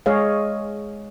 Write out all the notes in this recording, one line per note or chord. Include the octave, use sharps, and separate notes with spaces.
G#3 G#4 C#5 D#5 F5